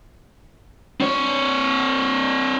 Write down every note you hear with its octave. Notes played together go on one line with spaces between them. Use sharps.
C4 C#5